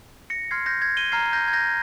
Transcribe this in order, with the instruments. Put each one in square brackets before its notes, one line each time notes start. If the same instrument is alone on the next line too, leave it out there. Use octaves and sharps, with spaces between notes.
[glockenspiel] A#6 C#7
C6 F6 G#6 C7
G6 A#6
G#6
D#7 G7
A#5 F6 G#6 C7
G6 A#6
G#6
G6 A#6